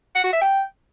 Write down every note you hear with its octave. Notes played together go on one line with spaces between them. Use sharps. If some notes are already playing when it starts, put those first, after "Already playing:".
F#5
F#4
E5
G5